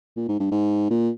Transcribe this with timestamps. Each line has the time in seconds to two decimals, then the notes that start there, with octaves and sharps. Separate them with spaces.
0.17 A#2
0.28 G#2
0.40 G2
0.51 G#2
0.90 A#2